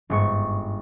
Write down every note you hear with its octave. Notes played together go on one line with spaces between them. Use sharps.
G1 G#2 C#6